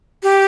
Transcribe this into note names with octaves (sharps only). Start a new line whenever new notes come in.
G4